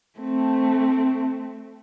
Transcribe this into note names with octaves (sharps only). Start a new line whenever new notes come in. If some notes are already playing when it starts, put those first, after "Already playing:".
A3 C4